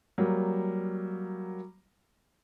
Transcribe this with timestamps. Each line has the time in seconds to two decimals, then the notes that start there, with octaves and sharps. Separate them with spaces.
0.18 F#3 G3 A#3